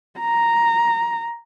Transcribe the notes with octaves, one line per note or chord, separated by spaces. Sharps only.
A#5